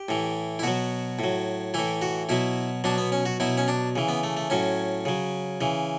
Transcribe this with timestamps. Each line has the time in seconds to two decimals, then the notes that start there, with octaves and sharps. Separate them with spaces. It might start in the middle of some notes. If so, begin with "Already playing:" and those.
Already playing: G4
0.09 A2 E3
0.59 E4
0.63 B2 F#3 F#4
1.19 A2 F#3
1.74 A2 E3 E4
2.02 F#4
2.29 B2 F#3 E4
2.84 B2 F#3 D4
2.98 B3
3.12 C#4
3.26 F#4
3.40 B2 F#3 E4
3.57 C#4
3.68 D4
3.96 C#3 E3
4.08 B3
4.23 A3
4.37 A3
4.50 A2 F#3 C#4
5.05 C#3 F#3
5.61 C#3 E3